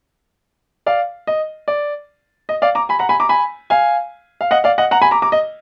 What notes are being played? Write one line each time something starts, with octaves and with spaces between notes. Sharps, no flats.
D5 F5
D#5
D5
D#5
D5 F5
A#5 D6
G#5 B5
F#5 A#5
G#5 B5
A#5 D6
G#5 B5
F5 G#5
F5
D#5 F#5
D5 F5
D#5 F#5
F#5 A#5
G#5 B5
A#5 D6
A#5 D6
D#5